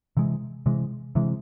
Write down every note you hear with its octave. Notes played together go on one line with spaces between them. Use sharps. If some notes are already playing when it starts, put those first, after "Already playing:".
C3 E3 G#3
C3 E3 G#3
C3 E3 G#3